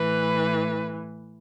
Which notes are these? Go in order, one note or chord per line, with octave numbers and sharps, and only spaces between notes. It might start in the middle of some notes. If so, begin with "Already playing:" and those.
Already playing: A2 E3 B4